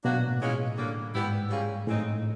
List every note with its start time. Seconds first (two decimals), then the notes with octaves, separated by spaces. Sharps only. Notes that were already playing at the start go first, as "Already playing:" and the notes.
0.05 B2 F#3 A#3 D4 F#4
0.17 A#2
0.29 A2
0.41 E3 G#3 C#4 F4 G#4
0.78 D3 G3 A#3
1.14 G#2 G3 B3 E4 G4
1.50 G3 A#3 C#4 F4 G#4
1.87 A2 G#3 C4 D#4